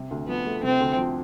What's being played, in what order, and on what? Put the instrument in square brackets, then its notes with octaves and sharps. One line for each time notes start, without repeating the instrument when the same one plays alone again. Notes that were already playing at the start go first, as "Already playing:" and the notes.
Already playing: [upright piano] C3
D2
[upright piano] F3 [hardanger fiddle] B3
[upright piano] A3
[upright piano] C3 [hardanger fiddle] C4
[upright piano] D2
F3